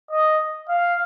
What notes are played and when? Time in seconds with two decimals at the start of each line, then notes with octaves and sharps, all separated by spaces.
0.11 D#5
0.69 F5